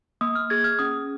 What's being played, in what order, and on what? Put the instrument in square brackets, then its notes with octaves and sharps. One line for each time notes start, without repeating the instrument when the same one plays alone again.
[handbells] A#3 D#6
F6
G#4 G#6
F6
C#4 D#6